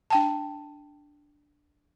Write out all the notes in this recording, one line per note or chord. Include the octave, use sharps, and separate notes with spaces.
D4 G5 A5